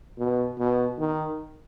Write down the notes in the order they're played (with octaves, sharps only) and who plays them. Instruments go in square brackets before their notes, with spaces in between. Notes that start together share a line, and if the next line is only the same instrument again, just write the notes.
[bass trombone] B2
B2
D#3